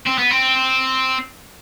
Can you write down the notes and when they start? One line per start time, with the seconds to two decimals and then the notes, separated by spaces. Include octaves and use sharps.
0.06 C4
0.18 B3
0.31 C4